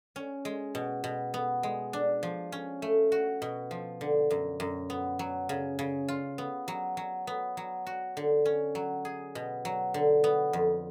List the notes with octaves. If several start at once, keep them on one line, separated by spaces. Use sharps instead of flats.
C#4
G#3
B2
B2
B3
G#3
D4
F3
C#4
A3
F#4
B2
F3
D3
F#2
F#2
B3
F#3
C#3
C#3
F4
B3
F#3
F#3
B3
F#3
F#4
D3
C#4
F#3
G#4
B2
F#3
D3
B3
F2